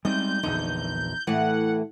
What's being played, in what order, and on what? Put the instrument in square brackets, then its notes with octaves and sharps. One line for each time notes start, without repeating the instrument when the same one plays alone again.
[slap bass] G3 G#3 C4 [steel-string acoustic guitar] D#4 [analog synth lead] G6
[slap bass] A#1 E2 D3 [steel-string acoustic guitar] D#4
[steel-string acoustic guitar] A2 A3 [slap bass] E3 [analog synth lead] F#5